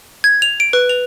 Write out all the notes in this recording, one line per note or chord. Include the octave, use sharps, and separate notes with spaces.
G#6
F7
D7
B4
F7